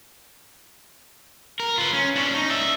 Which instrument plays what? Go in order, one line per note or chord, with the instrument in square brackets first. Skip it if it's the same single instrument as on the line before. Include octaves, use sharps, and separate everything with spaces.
[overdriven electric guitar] A#4
F4 B4
C#4
C#4 D4
D#4
D5 E5